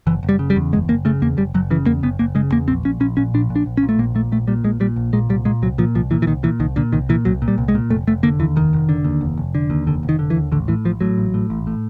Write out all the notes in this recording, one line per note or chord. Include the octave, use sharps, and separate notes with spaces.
F#1 E3
F#1
G3
C#3
G3
E2
F#1 G#3
F#1 A#3
C#3 A3
E2 A#3
F#1 G3
F#1 F#3
C#3 E3
E2 A#3
F#1 B3
F#1 A#3
C#3 G#3
E2 A#3
A#1 C4
A#2 C#4
A#1 C#4
A#2 C#4
A#1 D4
A#2
D4
A#1
C#4
A#2
A3
A#1 A#3
A#2 A3
A#1 A3
A#2 G3
A#1 G#3
A#2 G3
A#1
A#2 G#3
C2 G3
A#2 G#3
C2 F#3
A#2 F3
C2 F3
A#2 E3
E3
C2 D#3
A#2 E3
C2 D#3
A#2 D3
C2 D#3
A#2 E3
C2 F#3
A#2
G3
C2
G#3
A#2
F1 A3
F1 A3
D3 A#3
D#2 E3
F1 D#3
F1
D3
D#2
F1
F1
D3
D#2
F1 D3
F1
D#3
D3
E3
D#2
A1 D3
A2 E3
A1 F3
A2 F#3
A1
A2
A1
A2